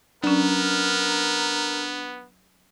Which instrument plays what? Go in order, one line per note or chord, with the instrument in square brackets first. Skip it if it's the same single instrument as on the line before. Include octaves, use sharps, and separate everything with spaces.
[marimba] F#3 C#4 [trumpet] B3 [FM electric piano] D4 [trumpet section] A#4